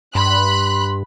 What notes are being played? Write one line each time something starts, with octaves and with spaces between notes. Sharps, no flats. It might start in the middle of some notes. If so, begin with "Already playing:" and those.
G2 B5 C6 F#6